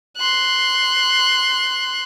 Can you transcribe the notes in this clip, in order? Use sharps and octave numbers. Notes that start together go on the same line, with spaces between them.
C6 F#6